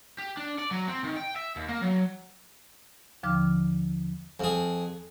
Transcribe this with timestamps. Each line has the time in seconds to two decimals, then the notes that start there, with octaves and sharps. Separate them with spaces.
0.19 G4
0.37 D4
0.59 D5
0.71 F#3
0.88 C4
1.04 D#3
1.17 G5
1.36 E5
1.56 D#2
1.69 A#3
1.82 F#3
3.23 D#2 D3 F3 D6 F6
4.40 F2 G#4